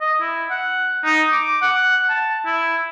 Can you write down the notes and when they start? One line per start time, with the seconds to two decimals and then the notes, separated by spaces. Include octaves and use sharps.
0.01 D#5
0.21 E4
0.51 F#5
1.05 D#4
1.32 D6
1.62 F#5
2.09 A5
2.46 E4